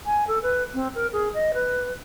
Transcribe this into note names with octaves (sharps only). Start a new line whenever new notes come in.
G#5
A4
B4
C4
A#4
G#4
D#5
B4